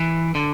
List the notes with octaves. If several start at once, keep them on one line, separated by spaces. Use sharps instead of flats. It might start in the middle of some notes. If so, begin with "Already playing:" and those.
Already playing: E3
D3